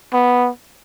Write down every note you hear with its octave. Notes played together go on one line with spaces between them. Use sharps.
B3